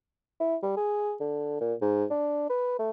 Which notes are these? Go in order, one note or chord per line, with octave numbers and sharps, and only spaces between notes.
E4
G3
G#4
D3
A#2
G#2
D4
B4
A3